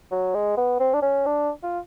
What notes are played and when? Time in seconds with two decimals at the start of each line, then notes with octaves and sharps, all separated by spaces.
0.11 F#3
0.34 G#3
0.57 B3
0.80 C4
0.93 D4
1.02 C#4
1.26 D4
1.63 F4